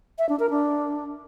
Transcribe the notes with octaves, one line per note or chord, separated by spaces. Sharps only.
E5
D4
A#4
D4